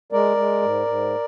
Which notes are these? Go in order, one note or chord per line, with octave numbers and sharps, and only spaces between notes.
G#3 A#4 D5
G#3
G#2
G#2